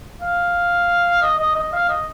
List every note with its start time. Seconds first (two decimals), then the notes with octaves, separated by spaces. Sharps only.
0.22 F5
1.22 D#5
1.39 D#5
1.55 D#5
1.73 F5
1.89 D#5